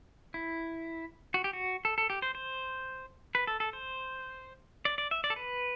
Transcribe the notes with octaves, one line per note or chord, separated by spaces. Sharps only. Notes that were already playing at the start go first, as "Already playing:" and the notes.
E4
F#4
G4
F#4
A4
A4
G4
C5
C5
B4
A4
A4
C5
D5
D5
E5
D5
A4
B4